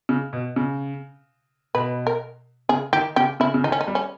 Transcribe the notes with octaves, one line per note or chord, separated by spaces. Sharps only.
C#3
B2
C#3
B2 B4
A#4
C#3 G#4
D#3 G4
C#3 G4
C#3 E4
C#3
D#3 D#4
C#4
D#4
G3
C#4